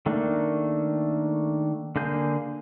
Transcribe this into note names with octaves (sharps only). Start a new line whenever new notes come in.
D#3 A3 A#3 D4
D3 A#3 G#4 G6